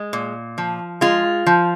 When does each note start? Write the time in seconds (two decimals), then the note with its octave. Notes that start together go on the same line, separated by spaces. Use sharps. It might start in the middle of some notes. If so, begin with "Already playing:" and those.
Already playing: G#3
0.13 A#2
0.58 F3
1.01 G#3 F4
1.47 F3